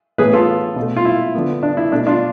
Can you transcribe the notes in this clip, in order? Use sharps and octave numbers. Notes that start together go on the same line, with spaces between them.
A2 E3 B3 G#4 B4
F4 A4
B2
A3
F4
E4
D3 F3 B3
D4
E4
B2 A3 D4
D4 F4